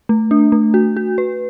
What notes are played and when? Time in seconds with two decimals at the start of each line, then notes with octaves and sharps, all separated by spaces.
0.09 A3
0.31 D4
0.52 A3
0.74 F#4
0.97 F#4
1.18 B4